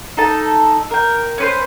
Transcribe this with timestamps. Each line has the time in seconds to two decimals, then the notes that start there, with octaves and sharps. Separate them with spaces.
0.17 D#4 A4 A5
0.91 A#4 G5
1.38 C#4 B4 C5